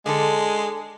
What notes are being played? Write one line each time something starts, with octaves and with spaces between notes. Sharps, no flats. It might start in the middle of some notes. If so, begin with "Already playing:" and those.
D3 G#3 A4